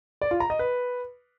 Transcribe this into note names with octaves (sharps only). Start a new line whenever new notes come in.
D5
F4
A#5
D#5
B4